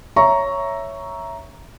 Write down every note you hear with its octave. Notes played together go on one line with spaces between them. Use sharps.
C#5 E5 A#5 C#6